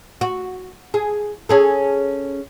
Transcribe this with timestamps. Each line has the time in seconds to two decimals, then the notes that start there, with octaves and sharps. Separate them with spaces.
0.21 F#4
0.94 G#4
1.49 C#4 G#4 A4